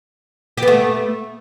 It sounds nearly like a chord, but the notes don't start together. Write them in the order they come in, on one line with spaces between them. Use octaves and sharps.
G4 B3 A3